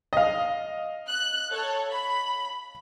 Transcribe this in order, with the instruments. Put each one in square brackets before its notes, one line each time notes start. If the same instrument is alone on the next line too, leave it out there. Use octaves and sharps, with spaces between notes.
[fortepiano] D#5 F5
[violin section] F#6
A4 C#5
B5